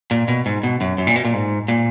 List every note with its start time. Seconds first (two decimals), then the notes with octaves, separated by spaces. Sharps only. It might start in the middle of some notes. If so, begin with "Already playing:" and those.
0.11 A#2
0.28 B2
0.46 G#2
0.63 B2
0.81 F#2
0.98 F#2
1.07 A#2
1.16 B2
1.25 A#2
1.34 G#2
1.68 A#2